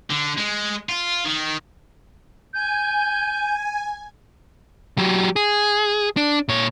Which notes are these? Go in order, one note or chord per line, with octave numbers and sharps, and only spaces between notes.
D3
G#3
F4
D#3
G#5 G6
F#3 G4
G#4
D4
A#2 C#5